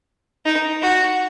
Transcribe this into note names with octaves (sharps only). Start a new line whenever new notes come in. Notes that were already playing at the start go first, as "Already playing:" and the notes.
D#4
F#4